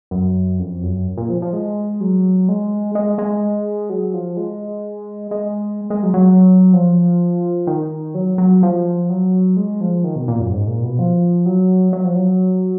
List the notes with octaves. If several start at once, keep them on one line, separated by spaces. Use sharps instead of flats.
F#2
F2
F#2
A#2
F3
F3
G#3
F#3
G#3
G#3
G#3
F#3
F3
G#3
G#3
G#3
F#3
F#3
F3
D#3
F#3
F#3
F3
F#3
G#3
F3
D#3
B2
A#2
F#2
G#2
A#2
B2
F3
F#3
F#3
F3
F#3